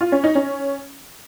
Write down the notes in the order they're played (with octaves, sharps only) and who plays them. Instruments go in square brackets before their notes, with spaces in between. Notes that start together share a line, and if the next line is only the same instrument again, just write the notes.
[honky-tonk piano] F4
C#4
D#4
C#4